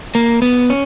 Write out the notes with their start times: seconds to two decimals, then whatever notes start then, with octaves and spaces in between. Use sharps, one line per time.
0.15 A#3
0.42 B3
0.70 C#4